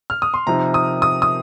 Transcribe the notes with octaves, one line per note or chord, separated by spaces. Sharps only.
F6
D#6
C6
C3 F3 D#4 A#5
D#6
D#6
D#6